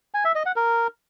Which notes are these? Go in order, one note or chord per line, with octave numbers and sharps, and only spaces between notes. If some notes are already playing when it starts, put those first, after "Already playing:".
G#5
E5
D#5
F#5
A#4